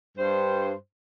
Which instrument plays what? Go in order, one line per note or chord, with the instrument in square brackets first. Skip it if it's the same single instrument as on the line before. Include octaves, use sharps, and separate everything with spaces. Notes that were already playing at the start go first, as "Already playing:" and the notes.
[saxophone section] G2 C5